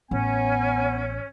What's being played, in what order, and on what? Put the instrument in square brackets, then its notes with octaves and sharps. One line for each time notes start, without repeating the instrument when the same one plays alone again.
[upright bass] A1 [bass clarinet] B3 [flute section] C#4 [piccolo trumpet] G#5